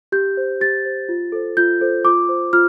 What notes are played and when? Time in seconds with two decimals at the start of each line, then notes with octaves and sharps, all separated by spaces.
0.12 G4 G6
0.37 C5
0.60 G4 A6
0.85 C5
1.09 F4
1.32 A4 C5
1.57 F4 G6
1.81 A4 C5
2.05 F4 D6
2.29 C5
2.53 F4 F6